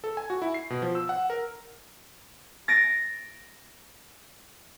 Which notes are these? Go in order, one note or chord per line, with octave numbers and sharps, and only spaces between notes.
A4
G#5
F#4
E4
C7
B2
F3
E6
F#5
A#4
A6 A#6 D7